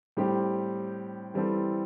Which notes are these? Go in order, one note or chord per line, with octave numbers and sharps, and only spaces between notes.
A2 G3 C4 G4 C5
E3 G3 C4 A4